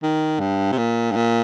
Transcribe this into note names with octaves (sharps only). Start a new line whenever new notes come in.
D#3
G2
C3
A#2
G2
A#2